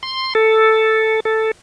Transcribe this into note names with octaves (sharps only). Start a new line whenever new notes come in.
C6
A4
A4